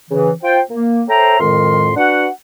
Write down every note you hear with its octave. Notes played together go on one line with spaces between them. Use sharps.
C#3 E3
F4 C5 G5
A#3
A4 C5 C#5 E5 G5 A#5
F2 A2 D#3 G#3 A#4 C6
D4 F#4 B4 F#5